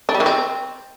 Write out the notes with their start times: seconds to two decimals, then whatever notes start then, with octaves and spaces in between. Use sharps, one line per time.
0.09 D4
0.14 G3
0.20 D#3
0.26 C4